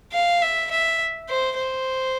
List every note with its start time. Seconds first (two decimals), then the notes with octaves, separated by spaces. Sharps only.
0.13 F5
0.42 E5
0.71 E5
1.29 C5
1.57 C5